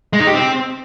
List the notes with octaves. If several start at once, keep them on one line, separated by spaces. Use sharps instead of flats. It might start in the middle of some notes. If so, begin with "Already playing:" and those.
G#3
D#4
G4
C4